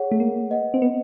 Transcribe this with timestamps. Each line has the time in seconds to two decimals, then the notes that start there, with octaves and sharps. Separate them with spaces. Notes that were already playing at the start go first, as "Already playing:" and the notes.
Already playing: G#4 C#5 F#5
0.12 A3
0.20 A#3
0.50 B4 D#5 F#5
0.74 C4
0.82 B3